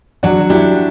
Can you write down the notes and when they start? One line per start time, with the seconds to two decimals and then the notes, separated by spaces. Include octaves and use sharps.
0.23 F#3 D4 F#4
0.50 D4 E4 G4